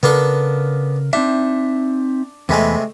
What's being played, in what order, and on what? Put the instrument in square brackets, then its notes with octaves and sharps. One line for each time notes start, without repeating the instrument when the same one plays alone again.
[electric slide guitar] C#3 A#4 [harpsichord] B3 D4 A4
[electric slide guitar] C4 D#4 E5 [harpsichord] D4
[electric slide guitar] E2 B4 G#5 [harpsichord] C3 G#3 A3